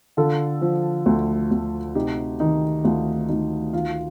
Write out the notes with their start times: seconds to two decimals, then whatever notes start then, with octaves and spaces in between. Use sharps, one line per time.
0.17 D3 F4 A4
0.62 F3
1.06 D2
1.51 D2
1.95 C3 D#4 G4
2.40 D#3 D#4
2.85 D2 F4
3.29 D2 D#4
3.73 D#3 F4